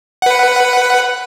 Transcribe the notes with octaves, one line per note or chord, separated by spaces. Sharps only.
B4 F#5